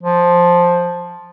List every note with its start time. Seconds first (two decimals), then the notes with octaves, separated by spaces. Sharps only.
0.03 F3